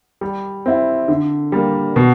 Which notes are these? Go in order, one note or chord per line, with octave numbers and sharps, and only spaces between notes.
G3
C4 E4
D3
G3 A#3
B2